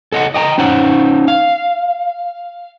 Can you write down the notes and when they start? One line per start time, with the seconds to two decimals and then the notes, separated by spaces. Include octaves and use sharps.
0.12 A4 D#5 F5 F#5
0.34 D#5 G5 A5 A#5
0.58 C#4 D#4 C5 F#5
1.28 F5